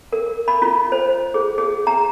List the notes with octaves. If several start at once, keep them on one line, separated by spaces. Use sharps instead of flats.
A#4
B5
F4
C5
G#4
G#4
A#5